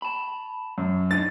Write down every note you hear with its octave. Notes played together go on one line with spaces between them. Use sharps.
A5 B5
F#2
B1 D4 D#4 A6